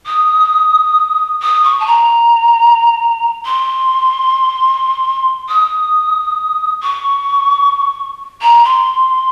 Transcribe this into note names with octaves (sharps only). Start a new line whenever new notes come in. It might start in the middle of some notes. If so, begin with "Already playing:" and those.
D#6
D#6
C#6
A5
A#5
C6
D#6
C#6
A#5
C6